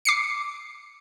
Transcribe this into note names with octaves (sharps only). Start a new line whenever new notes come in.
D6 C7 C#7